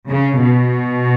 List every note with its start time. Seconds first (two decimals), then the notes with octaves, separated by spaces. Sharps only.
0.09 C#3
0.42 B2